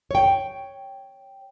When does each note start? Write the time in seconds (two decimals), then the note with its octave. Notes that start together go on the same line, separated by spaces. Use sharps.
0.11 C#5 G5